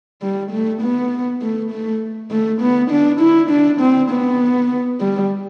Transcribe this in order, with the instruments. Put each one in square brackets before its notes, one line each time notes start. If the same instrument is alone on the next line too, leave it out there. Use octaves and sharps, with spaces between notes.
[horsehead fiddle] G3
A3
B3
A3
A3
A3
B3
D4
E4
D4
C4
B3
G3